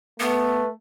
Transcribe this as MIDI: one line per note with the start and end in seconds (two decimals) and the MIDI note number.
0.20 0.71 57
0.20 0.62 59
0.20 0.68 71